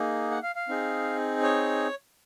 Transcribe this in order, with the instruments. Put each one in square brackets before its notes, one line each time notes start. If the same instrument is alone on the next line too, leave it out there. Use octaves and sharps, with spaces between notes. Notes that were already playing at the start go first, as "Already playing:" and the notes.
Already playing: [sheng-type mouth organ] A#3 D#4 G#4
F#5
F5
F5
C4 D#4 G#4
C#5